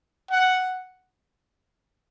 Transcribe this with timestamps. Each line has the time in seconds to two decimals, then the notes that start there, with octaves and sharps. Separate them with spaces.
0.31 F#5